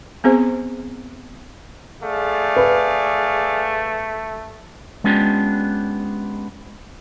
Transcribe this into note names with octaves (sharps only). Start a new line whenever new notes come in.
B3 C4 G#4 C5
A3 G#4 D5 F5
B4
G#3 B3 C#4 D4 F4 G4